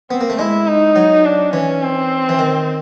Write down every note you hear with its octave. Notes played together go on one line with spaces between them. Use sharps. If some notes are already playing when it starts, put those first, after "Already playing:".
B3 C4
A#3
A3
G#3 E4
D#4
F#3
D4
E3 C#4
C4
E3
D#3